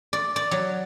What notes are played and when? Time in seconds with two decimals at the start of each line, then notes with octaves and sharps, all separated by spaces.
0.13 D5
0.36 D5
0.51 F#3